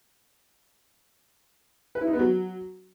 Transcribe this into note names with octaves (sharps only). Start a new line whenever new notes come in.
B4
E4
D#4
B3
F#3